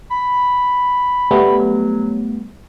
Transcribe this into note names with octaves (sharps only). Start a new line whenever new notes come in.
B5
G3 A3 B3
F#3